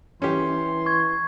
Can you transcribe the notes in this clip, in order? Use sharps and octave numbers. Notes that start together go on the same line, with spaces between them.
E3 C#4 G4 C6
C#6 G#6